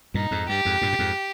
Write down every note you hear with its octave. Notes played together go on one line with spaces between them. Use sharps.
G2 A#2 D#4
F2 G#2
G2 G4
F2 G#2
G2 A#2
A#2
F2 G#2